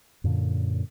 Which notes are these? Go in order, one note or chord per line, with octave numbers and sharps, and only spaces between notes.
F#2 A#2 D3